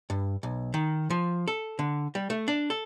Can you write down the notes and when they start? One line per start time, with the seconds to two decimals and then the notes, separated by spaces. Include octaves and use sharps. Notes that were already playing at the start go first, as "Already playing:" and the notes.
0.10 G2
0.43 B1
0.74 D#3
1.10 F3
1.48 A4
1.79 D3
2.15 G3
2.30 A3
2.48 D4
2.70 A4